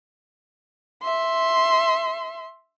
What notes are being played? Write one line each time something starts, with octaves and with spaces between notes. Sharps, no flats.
E5 C6